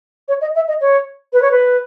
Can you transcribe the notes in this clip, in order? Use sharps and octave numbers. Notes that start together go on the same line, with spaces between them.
C#5
D#5
E5
D#5
C#5
B4
C#5
B4